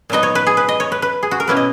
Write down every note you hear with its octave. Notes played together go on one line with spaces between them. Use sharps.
A#2 F#3 B3 D#4 D#5
C#5
B4
G#4
B4
D#5
C#5
B4
B4
G#4
F#4
A#4
B2 A#3 C#4 E4 B4
D#5